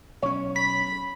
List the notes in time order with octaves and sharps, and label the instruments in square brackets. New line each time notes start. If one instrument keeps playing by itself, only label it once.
[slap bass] B1 C#4 [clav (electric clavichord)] C#5
[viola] B5 [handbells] B6